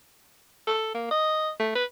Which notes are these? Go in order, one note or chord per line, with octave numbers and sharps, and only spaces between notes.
A4
A#3
D#5
A3
B4